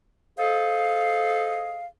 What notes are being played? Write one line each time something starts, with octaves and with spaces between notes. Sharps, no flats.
G#4 A4 C5 D#5 F5